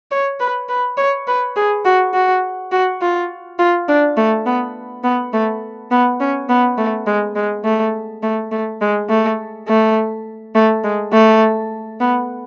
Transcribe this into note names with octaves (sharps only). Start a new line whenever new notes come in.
C#5
B4
B4
C#5
B4
G#4
F#4
F#4
F#4
F4
F4
D4
A3
B3
B3
A3
B3
C#4
B3
A3
G#3
G#3
A3
A3
A3
G#3
A3
A3
A3
G#3
A3
B3